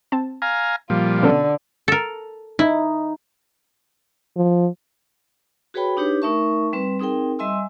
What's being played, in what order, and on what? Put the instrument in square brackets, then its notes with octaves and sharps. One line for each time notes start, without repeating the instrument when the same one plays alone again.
[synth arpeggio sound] C4 A5
[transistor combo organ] F5 G#5 A#5
[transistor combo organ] A#2 F3 G3 [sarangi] F4
[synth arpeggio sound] B2 C#4 A4 [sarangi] D3
[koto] A4 A#4
[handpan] D#4 [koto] E4
[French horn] F3
[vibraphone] F#4 G#4 B4 C#5 G5 B5
D4 D#4 G4 B4 C#5
A3 D#4 A#4 E5 A5 C#6
G3 C4 B4
C4 D#4 G#4 A#4 G5
G3 D#5 E5 G#5 C6 E6